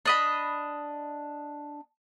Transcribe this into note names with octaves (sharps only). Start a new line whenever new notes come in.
D4 D#5 B5